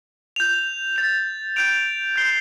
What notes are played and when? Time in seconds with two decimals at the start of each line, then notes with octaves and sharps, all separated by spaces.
0.36 G6 F7
0.96 A6 F7
1.56 G6 D7 F7
2.16 G6 C7 G7